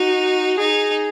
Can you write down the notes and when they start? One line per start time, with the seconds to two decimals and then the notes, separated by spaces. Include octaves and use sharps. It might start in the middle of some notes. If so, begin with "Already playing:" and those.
Already playing: D#4 F#4
0.58 D#4 G#4